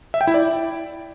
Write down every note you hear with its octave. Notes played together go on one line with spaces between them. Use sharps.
E5
G5
E4
D5